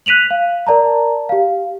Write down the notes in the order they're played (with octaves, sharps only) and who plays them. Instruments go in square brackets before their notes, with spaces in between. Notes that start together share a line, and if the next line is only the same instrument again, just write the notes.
[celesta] F#6 B6 D#7 F7 F#7
F5
A#4 D5 A5 A#5
G4 F5